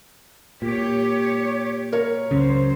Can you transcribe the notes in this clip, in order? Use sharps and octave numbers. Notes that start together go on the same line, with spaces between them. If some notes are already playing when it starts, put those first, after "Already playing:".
A#2 G4 C#5
A#4 C#5
C#2 F#2 C#3 F#3 C5